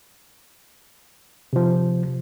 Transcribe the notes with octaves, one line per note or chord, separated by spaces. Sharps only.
C3 F3